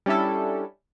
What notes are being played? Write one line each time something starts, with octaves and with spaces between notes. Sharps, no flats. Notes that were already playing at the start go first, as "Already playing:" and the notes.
G3 C#4 D4 E4 A4